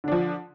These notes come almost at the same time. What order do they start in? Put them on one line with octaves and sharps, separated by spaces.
D3 D4 F3